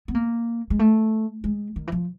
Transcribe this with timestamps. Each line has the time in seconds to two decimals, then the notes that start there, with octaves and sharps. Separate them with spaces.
0.08 B3
0.15 A#3
0.70 G#3
0.79 A3
1.44 G#3
1.76 D#3
1.87 E3
1.92 F3